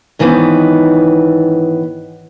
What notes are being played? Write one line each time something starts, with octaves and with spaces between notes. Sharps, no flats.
G#2 D#3 E3 A3 B3 C#4